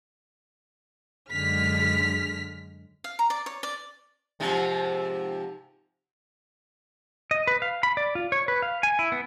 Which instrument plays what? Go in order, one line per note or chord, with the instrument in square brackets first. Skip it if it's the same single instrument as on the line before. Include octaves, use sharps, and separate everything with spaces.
[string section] F#2 D3 G#3 F6 B6
[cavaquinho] F5
A#5
D5
C#5
D5
[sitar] G#2 C3 F3
[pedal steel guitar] D#5
B4
F5
B5
D5
F4
C#5
B4
F5
G#5
E4
B3